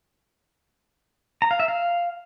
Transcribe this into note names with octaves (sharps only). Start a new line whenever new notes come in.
A#5
F5
E5
F5